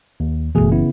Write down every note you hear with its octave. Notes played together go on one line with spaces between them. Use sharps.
D#2
F#1 B1 B2 E3 A3 G#4
C#3 B3 E4